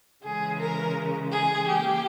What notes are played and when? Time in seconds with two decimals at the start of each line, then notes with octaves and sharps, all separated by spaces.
0.24 C#3 E3 G#3 G#4
0.61 A#4
1.32 G#4
1.67 E3 A#3 G4